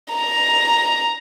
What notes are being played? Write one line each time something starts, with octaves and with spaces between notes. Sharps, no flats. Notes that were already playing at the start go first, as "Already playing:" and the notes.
A#5